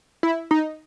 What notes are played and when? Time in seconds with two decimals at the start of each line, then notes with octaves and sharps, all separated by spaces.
0.23 E4
0.51 D#4